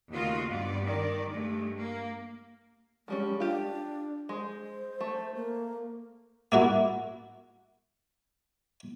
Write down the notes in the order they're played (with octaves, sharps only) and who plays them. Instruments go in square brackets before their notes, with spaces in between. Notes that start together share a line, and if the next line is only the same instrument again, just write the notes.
[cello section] D#2 C#3 A3 F4 F#4 D#5
G2 B3 D5
D#3 D5
G2 G#3 A3
A#3
[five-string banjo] F3 G3 C#4 [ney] G#3
[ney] D4 [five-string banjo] F4 G4
[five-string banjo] G#3 [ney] C5
[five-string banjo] A3
[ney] A#3
[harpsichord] A#3 E4 F#4